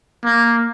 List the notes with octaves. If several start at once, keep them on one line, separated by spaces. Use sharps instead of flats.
A#3